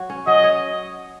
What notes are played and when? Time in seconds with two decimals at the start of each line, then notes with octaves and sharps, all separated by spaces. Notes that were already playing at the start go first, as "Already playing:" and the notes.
Already playing: F#3 F#4 C#5
0.10 C#4
0.27 F#3 D#5
0.44 C#5